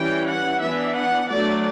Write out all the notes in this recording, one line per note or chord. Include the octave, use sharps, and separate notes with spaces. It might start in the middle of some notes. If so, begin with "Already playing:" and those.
Already playing: E3 G3 C#4 G5
F#5
E3 B3 D4 E5
F#5
F#3 A3 D4 D5